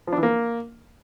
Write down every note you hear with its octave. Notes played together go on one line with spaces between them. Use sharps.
F3
D4
E3
A#3